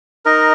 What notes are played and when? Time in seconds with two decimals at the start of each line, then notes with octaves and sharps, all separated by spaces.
0.25 D#4 A#4 D#5